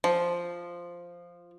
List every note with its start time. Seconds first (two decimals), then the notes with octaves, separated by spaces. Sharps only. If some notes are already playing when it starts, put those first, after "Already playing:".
0.04 F3